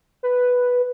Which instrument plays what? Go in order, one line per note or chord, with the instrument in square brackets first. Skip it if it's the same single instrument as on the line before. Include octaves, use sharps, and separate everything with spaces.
[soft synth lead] B4